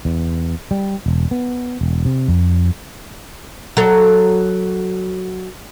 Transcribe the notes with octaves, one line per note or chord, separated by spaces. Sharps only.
E2
G3
E1
B3
E1
C3
F2
F#3 A4